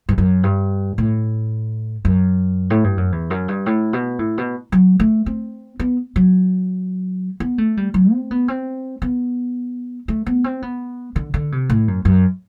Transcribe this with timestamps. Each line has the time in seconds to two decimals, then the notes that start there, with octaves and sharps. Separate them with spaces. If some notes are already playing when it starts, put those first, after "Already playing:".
0.09 G2
0.18 F#2
0.43 G2
0.98 A2
2.05 F#2
2.70 A2
2.84 G2
2.97 F#2
3.12 E2
3.30 F#2
3.48 G2
3.66 A2
3.93 B2
4.19 A2
4.38 B2
4.72 F#3
5.00 A3
5.26 C4
5.79 B3
6.16 F#3
7.40 B3
7.58 A3
7.77 G3
7.94 F#3
8.12 C4
8.31 B3
8.48 C4
9.02 B3
10.08 A3
10.26 B3
10.44 C4
10.62 B3
11.16 D3
11.34 D3
11.52 C3
11.70 A2
11.88 F#2
12.05 F#2